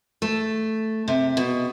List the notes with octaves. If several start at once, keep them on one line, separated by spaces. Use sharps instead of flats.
A3
C3
B2